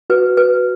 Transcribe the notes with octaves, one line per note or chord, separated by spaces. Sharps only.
F#4 B4
B4